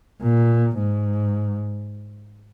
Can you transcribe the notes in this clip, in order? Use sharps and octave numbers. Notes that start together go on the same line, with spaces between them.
A#2
G#2